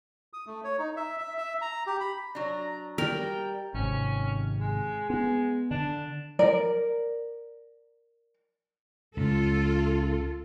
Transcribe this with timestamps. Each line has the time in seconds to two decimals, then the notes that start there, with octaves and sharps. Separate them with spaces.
0.33 D#6
0.46 A3
0.64 C#5
0.79 D#4
0.97 E5
1.18 E5
1.37 E5
1.61 A#5
1.87 G4
2.00 B5
2.35 F#3 D4 A#5
2.98 G3 A#4 G5
3.74 G#1 C3 C#4
4.60 G#3
5.10 G#3 B3
5.71 D3 D4
6.39 A#4 D5
9.17 C#2 F4 A4